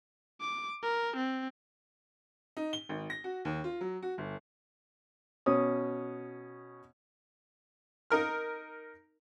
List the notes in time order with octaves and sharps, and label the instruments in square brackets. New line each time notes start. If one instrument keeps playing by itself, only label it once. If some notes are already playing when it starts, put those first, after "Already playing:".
[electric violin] D6
A#4
C4
[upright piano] D#4
G7
G#1
A#6
F#4
D#2
F4
F#3
F#4
G1
[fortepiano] B2 C#4 D#6
D#4 A#4 F6